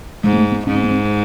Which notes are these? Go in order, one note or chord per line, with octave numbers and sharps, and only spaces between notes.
G#2 G#3
A#3
A3
B3
G#2 C#4
C4
B3
C4